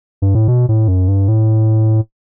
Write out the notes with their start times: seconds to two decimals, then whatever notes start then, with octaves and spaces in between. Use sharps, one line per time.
0.22 G2
0.35 A2
0.48 B2
0.69 A2
0.88 F#2
1.08 G2
1.28 A2